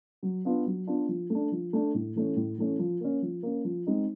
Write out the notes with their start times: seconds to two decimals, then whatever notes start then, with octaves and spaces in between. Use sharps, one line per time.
0.23 F#3
0.45 B3 D4 F4
0.66 F#3
0.87 B3 D4 F4
1.09 F3
1.30 A3 D4
1.52 F3
1.73 A3 D4
1.94 A2
2.16 E3 A3 C#4
2.36 A2
2.58 E3 A3 C#4
2.79 F3
3.01 A#3 C#4
3.22 F3
3.43 A#3 C#4
3.65 F3
3.87 G#3 C4 D#4